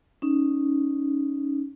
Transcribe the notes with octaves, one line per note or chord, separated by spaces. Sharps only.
C#4 D#4